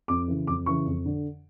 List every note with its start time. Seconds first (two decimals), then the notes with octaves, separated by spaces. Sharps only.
0.08 F2 D6
0.28 C#3 E3
0.47 F2 D6
0.66 C#3 E3 C#6
0.87 F2
1.06 D3